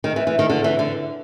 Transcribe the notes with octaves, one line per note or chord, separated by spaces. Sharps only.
D#3
E3
E3
D#3
D3
E3
D3